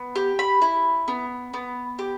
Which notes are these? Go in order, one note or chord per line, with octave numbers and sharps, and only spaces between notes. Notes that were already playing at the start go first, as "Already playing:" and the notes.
Already playing: B3
G4
B5
E4
B3
B3
G4